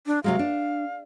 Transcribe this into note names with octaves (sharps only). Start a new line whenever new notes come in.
D4
C3 F#3 G#3 F5
D4